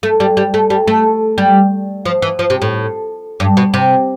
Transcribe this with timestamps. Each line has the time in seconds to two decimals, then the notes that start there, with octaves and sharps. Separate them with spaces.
0.03 A3
0.20 G3
0.37 G3
0.54 A3
0.70 G3
0.87 A3
1.38 G3
2.05 F3
2.22 E3
2.39 F3
2.50 C3
2.62 A2
3.40 G2
3.57 B2
3.74 C3